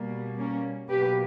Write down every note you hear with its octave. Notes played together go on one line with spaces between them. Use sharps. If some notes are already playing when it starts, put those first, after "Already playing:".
Already playing: B2 G3 A#3
A#3 C#4
B2 F#3 A#3 G4 B4